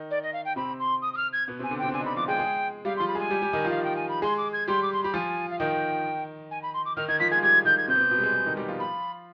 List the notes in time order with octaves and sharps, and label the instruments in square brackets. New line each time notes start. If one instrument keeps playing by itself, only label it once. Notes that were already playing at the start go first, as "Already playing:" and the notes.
Already playing: [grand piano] D#3 D#4
[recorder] D5
D#5
F5
G5
[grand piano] C3 C4 [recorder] B5
[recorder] C6
D#6
D#6
F6
G#6
[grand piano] B2 B3
[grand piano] C3 C4 [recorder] G#5
[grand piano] D3 D4
[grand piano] C3 C4 [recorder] G5
[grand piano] C4
[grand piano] D3 D4 [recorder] G#5
[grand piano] D#4
[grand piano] D3 D4 [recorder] B5
[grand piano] F3 F4 [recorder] D6
[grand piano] G#3 G#4 [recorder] G5
[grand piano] G#3 G#4
[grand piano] G3 G4 [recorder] F5
[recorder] C6
[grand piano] F3 F4
[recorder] B5
[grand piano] G#3 G#4 [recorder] G#5
[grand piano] G3 G4
G3 G4
D#3 D#4
[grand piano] F3 F4 [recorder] F5
[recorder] G5
G#5
B5
[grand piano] G#3 G#4 [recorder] C6
[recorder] D6
G#6
[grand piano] G3 G4 [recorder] C6
[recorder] D6
C6
[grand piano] G4 [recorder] B5
[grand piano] F3 F4 [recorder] G#5
[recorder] F5
[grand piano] D#3 D#4 [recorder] G5
[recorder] G#5
B5
C6
D6
[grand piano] D#3 D#4 [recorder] F6
[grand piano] D#3 D#4 [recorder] G#6
[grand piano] F3 F4 [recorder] B6
[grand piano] G#3 G#4 [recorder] G#6
[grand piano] F4
[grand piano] G3 G4 [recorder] G#6
[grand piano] D#3 D#4 [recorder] G6
[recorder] G#6
[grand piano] C3 C4 [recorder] G6
[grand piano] B3
C3 C4
B2 B3
G3
G#3
G#3
D#3 D#4
G3 G4
F3 F4
[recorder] B5